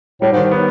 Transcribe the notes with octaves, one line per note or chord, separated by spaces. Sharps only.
A2 G3
G#2
D#3
G#2
B3